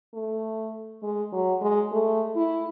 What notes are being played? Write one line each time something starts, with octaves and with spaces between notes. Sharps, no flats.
A3
G#3
F#3
G#3
A3
E4